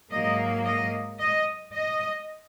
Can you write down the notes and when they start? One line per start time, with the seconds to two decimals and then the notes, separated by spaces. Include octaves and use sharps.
0.11 G#2 F#3 A#3 D#5
0.65 D#5
1.20 D#5
1.73 D#5